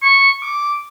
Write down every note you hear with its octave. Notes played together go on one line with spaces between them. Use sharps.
C#6
D6